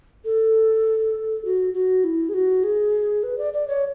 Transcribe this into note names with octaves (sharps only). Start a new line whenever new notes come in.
A4
F#4
F#4
E4
G#4
F#4
G#4
B4
D5
D5
C#5